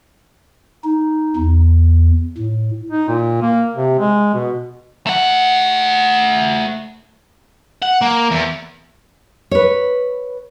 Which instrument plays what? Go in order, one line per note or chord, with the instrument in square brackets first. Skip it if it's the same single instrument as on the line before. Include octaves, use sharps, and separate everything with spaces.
[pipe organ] D#4
E2
A2
[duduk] D#4
A#2
A#3
C3
G#3
B2
[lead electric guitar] A3 F#5
[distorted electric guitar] F#5
A#3
E2
[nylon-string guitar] B4 C#5